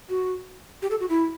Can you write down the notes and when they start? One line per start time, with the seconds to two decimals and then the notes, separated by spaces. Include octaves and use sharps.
0.09 F#4
0.82 G4
0.91 A4
1.00 F#4
1.09 E4